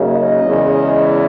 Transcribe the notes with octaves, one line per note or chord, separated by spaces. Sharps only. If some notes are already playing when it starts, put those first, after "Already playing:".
Already playing: F#2 C#3 F#3 A#3 D#4
D#5
E2 C#3 G#3